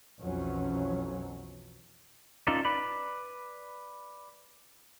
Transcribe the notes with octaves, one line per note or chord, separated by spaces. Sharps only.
B1 F2 E3 F#3 C#4
C#4 D#4 F4 A4 A#4 D5
B4 D5 B5